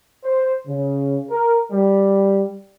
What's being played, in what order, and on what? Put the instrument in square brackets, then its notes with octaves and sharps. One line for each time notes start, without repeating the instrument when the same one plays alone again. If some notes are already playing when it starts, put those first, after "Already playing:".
[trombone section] C5
C#3
A#4
G3